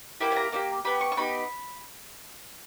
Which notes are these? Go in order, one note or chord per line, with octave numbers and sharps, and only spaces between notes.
A#3 E4 G4
G#5
A#5
A#3 D#4 G4
B3 G4 B5
C#6
C#6
B3 D#4 G4 B5